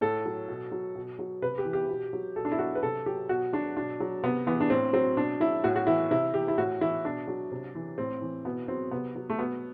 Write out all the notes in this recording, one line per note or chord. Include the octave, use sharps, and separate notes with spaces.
A2 A4
F#3
B2
F#3
B2
F#3
C3 B4
G4
E3
G4
B2
F#3
B2 A4
D4
E4
F#3 F#4
B4
C3 A4
F#3 G4
B2 F#4
F#3 D4
B2 D4
F#3
C3 B3
E3 B3
D4
A2 C4
F#3 C4
B2 D4
F#3 E4
A2 F#4
F#4
E3 E4
C3 E4
E3 G4
E4
A2 F#4
E3 E4
B2 D4
F#3
C3
E3
A2 C4
E3
B2 B3
F#3 C4
C3 B3
F#3
A3
B2 B3